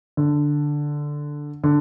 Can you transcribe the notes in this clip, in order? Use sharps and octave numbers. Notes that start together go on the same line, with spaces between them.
D3
D3